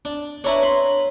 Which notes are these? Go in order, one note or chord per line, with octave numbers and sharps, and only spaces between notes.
D4
D4 E4 B4 C#5 A#5
B4 B5 C6